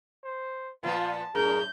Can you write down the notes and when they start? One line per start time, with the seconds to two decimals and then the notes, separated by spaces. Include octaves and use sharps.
0.24 C5
0.83 A#2 F3 B3 F4 A5
1.35 F#2 A2 G#4 A#4 G6